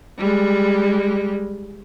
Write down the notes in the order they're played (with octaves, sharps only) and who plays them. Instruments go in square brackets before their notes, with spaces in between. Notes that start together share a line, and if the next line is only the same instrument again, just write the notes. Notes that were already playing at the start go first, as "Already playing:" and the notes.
[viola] G3 G#3